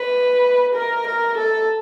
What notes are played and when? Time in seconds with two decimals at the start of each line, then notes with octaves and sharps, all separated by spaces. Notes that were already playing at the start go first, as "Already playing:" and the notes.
Already playing: B4
0.75 A#4
1.07 A#4
1.38 A4